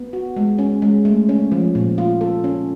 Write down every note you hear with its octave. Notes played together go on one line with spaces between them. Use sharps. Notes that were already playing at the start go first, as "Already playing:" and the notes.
Already playing: B3
F#4
G#3
C#4
G#3
A3
C#4
F3
A#2
F4
A4
C#4